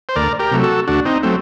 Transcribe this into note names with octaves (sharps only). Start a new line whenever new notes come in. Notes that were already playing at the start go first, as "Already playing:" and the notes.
C5
D2 A#4 D5
G4 A#4
C3 F#3 A3
F#4 A4
D2 D4 F#4
C4 D#4
F#3 A3 C4